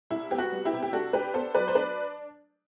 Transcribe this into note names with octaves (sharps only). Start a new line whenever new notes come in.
C2 E4
B3 G4
F#4
G3
E4 G4
C3
G4
D4 F#4 A4
D4 G4 B4
B3 A4 C5
F#3 B4 D5
C5
D4 B4 D5